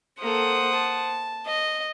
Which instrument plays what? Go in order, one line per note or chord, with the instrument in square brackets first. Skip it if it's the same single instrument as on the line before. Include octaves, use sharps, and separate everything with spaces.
[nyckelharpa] A#3 A4 [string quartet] C5 F#5 D#6
[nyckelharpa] A5
[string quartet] D#5